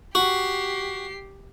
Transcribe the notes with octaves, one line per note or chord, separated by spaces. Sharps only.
F#4 G4 C7